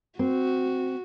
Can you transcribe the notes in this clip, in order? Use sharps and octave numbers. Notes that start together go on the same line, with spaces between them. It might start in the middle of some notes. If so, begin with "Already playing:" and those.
C4 F#4